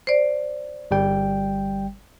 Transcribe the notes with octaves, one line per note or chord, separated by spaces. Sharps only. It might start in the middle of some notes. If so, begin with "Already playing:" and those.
C5 D5
G1 G3 G5